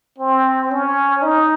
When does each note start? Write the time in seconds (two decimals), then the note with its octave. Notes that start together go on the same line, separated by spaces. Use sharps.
0.19 C4
0.70 C#4
1.22 D#4